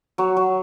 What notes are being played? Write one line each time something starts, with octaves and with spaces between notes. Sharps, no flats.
F#3 C#5
F#3